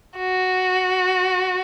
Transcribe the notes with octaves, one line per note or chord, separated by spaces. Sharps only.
F#4